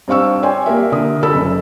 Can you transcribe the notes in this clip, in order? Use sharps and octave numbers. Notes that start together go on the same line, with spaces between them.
G2 C4 F5 C#6 E6
C#5 D5 G5 G#5 C6
A#3 G4 A#4 E5
D3 A#4 D#6
A4 B5 E6
F#1